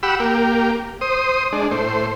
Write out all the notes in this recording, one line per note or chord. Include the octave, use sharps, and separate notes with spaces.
G4 F#5 B5 E6
A#3 G4
C5 D#6
G#3 D4
A2 C5